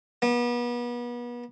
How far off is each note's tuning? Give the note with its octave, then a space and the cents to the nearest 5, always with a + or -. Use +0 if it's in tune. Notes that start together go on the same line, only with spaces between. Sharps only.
B3 -35